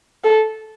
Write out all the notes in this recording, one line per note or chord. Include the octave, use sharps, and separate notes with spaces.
A4